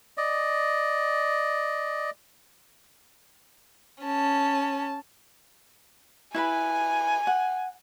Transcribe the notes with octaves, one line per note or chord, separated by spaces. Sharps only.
D5 D#5
C#4 A5
E4 B4 G#5 B5
F#5